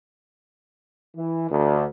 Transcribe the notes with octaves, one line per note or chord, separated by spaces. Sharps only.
E3
D2